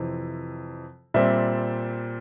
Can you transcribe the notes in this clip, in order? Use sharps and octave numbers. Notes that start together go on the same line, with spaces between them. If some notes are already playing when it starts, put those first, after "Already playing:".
Already playing: F2 C3 E3
A#2 G3 C4 E5